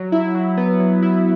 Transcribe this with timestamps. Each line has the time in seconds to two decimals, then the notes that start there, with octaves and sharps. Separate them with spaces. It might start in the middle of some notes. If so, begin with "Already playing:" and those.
Already playing: F#3
0.12 E4
0.35 F#3
0.57 B3
0.80 F#3
1.02 E4